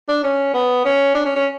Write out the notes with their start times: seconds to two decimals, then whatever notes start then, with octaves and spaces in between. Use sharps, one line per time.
0.09 D4
0.24 C#4
0.54 B3
0.85 C#4
1.15 D4
1.25 C#4
1.36 C#4